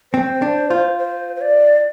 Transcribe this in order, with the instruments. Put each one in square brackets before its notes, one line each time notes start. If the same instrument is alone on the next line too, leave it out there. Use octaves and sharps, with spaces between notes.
[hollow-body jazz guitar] C4 [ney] C5
[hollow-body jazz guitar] D4
F4
[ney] C5
C5
D5